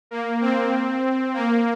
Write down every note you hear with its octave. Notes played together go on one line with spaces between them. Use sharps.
A#3
C4
A#3